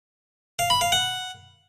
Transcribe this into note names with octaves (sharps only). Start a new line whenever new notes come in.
F5
B5
F5
F#5